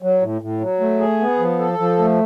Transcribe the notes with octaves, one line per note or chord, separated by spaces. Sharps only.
F#3
A2
A2
F#3
A3
G#4
B3
F3
A4
F3
A3